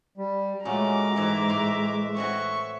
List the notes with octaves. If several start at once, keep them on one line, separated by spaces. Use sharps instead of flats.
G3
A#2 G#3 A3 C#4 F#4 A#5 D6
G#2 E3 C4 E5
A2 C6
C4 C#4 F#4 C#6